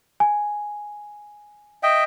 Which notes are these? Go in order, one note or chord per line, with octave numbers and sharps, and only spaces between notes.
G#5
D#5 E5 G5